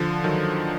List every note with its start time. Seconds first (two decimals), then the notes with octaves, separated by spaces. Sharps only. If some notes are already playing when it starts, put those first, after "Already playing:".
Already playing: D3 F3
0.24 D#3 F#3